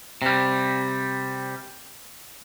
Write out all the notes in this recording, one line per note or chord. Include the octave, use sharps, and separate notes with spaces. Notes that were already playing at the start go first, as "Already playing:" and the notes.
C3 G3